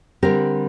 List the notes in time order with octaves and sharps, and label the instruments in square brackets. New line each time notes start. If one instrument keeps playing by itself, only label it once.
[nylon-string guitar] D3 G3 C4 G4 A#4